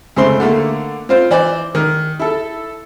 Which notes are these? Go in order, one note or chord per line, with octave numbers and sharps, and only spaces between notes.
C#2 A3 C4 C6
D3 A3 A#3
C4 F4 C5
E3 C5 D5
D#3
E4 A4